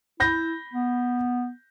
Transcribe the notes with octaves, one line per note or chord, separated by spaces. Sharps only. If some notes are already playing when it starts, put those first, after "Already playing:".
E4 B5 G6 A#6
B3